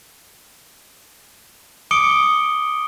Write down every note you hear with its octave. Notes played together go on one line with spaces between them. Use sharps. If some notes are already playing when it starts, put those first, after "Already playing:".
D6 D#6 C#7 D7 G7